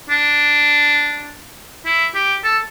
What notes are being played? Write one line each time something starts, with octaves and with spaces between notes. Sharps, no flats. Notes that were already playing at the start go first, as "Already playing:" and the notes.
D4
E4
G4
A4